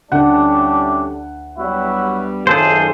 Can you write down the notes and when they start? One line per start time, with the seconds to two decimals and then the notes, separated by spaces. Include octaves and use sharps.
0.12 D2 G3 A3 C#4 D4 E4 G4 F#5
1.59 F#3 G3 B3 E4 F#4
2.47 B1 F#2 C3 D#3 F4 G#4 A4 C5